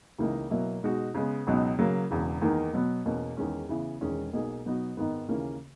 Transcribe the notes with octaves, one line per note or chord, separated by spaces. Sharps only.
C#2 C#3 E3 A#3 D#4
B2 F#3 A#3 E4
B2 G#3 D#4 F#4
C#3 G#3 B3
C#2 B2 F#3 B3 D#4
C#3 F#3 A#3
E1 E2 C#3
E2 D#3 A#3 D#4 A#4
B2 F#3 B3
E2 B2 A#3 C#4
E2 D#3 G#3 C#4
C#3 E3 B3 E4
E1 E2 D#3 G#3 C#4
B1 B2 A#3 D#4 G#4
B2 F#3 B3 D#4 F#4
G#1 G#2 D#3 G#3 B3
D#2 C#3 E3 A#3 C#4